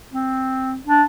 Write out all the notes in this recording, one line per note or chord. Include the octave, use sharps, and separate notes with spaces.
C4
D4